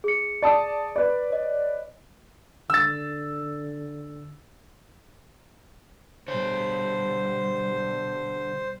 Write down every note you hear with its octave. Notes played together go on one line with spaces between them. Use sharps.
G#4 C#7
D5 A5 D#6
B4 D5
C#5 D#5
D3 E6 A6
B2 D3 G3 C5 C#5